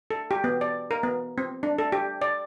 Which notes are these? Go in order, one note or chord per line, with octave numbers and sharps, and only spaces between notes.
A4
G4
B3
D5
A#4
B3
C4
D4
A4
G4
D5